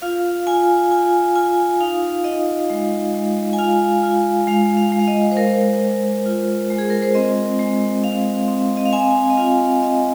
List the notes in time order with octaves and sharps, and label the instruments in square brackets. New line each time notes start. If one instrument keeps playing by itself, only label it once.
[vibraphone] F4 F5
F4 G#5
F4 G#5
F4 G#5
D#4 F5
D#4 D#5
G#3
G#3
G#5
F4 F5
F4
G#3 F5
F5
G#3
F5
D#5
C5
G#3 A#4
G#3
F4
G#3
G#4
A#4
C5
C4 D#5
G#3
C4 F5
C4
D#5
F5
C4 G#5
D#5
F4 F5
C4 D#5